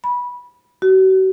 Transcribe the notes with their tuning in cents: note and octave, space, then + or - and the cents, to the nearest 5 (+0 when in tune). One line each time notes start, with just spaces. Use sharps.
B5 -15
F#4 +40